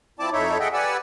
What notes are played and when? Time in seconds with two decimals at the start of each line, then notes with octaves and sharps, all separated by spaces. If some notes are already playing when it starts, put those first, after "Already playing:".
0.20 F3 C4 E4 D5 A5 D6
0.33 F2 D#4 E4 A4 C#5 E5
0.60 G#4 A4 D#5 E5 F#5 G5
0.73 G4 B4 D5 F#5 G#5 E6